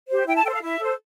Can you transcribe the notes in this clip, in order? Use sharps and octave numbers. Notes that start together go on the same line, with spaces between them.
G4 C5
E4 G5
A5
A4 C5 G5
F5
E4 E5
A4 C5